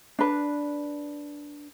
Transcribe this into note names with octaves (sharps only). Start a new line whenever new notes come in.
D4 B4